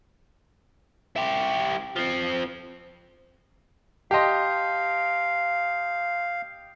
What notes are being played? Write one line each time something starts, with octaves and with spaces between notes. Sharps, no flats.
E4 G4
F3 C4
G4 D#5 F5 A5 C6